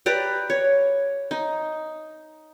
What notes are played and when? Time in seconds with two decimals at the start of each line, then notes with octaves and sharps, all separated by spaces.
0.06 G4 B4 D5 A#5
0.50 C#5
1.31 D#4